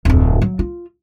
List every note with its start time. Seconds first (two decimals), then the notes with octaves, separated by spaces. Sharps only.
0.05 D1 F2
0.42 F#3
0.59 F4